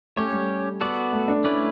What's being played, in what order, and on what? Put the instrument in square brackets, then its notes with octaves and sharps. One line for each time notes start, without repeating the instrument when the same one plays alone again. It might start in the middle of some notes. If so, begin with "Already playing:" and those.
[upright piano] A3 [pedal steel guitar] C#4 G4 C#5
[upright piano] G3
[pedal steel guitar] B3 F#4 A4 D5
[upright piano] A3
D4
[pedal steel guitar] A3 C#4 E4 B4 D5